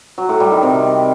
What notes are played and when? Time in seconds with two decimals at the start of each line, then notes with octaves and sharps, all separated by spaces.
0.18 F#3
0.29 A2
0.40 G3
0.51 D#3
0.63 C3